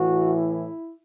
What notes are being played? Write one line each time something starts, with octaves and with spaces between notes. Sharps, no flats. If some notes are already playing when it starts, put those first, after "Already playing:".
Already playing: A2 E3 F#4
E4